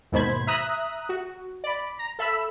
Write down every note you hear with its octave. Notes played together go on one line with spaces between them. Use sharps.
D#2 G#2 B2 C5 B5 G#6
E5 A#5 D#6 F#6
F#4
D5 B5
A#5
A4 E5 B5 E6